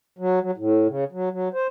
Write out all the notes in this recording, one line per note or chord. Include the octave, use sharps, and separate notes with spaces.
F#3
F#3
A2
C#3
F#3
F#3
C5